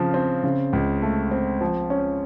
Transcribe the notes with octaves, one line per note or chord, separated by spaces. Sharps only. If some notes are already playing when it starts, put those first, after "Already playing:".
Already playing: C#3 F3 C4
C4
C#3
C#2
A3
C4
F3
C#4